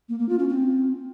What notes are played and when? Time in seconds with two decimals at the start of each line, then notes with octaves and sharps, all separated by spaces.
0.09 A#3
0.19 A#3
0.29 F4
0.39 C#4
0.49 C4